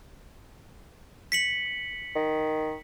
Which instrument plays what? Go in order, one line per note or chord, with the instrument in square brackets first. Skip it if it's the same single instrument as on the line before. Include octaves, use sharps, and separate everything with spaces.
[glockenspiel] B6 C#7 F#7
[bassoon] D#3